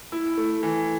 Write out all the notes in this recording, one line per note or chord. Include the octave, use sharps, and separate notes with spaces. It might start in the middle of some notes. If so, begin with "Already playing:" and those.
E4
A3
E3